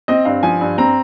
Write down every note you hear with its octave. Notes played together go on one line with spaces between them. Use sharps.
C4 D#5
G2 F5
F3 G#5
G2
C4 A#5